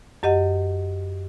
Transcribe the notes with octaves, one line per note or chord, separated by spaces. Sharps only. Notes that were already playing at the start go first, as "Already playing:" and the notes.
F#2 G4 D#5 F#5